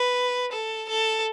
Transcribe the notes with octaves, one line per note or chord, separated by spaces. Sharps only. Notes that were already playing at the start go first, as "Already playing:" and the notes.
Already playing: B4
A4
A4